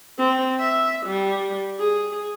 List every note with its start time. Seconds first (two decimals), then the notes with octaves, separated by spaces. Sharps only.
0.18 C4
0.59 E5
1.06 G3
1.78 G#4